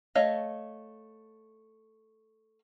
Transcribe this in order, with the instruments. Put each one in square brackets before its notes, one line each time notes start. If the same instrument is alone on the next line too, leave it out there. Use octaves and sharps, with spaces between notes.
[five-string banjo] A3 C#5 D#5 F5